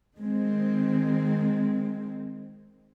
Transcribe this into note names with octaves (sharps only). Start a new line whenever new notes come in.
D#3 G#3 C4